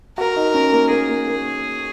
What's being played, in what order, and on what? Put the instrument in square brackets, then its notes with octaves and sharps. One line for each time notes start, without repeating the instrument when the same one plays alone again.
[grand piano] F#4 [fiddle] A#4
[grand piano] D#4
C#4
A#3
[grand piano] A#3 [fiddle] G#4
[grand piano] A#3
A#3